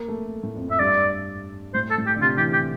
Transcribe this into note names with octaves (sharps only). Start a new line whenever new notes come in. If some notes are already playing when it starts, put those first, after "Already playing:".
Already playing: A#3
A3
A2
F2
F2 E5
G2 D5
A2 C5
A4
A2
G4
D3
C3 F4
E3 G4
G4